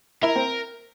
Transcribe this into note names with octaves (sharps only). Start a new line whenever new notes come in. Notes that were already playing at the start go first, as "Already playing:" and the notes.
E4 A#4
C4